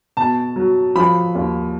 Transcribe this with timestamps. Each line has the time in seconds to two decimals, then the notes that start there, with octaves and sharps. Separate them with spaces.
0.17 B2 A5
0.56 F#3
0.95 F3 B5
1.35 D#2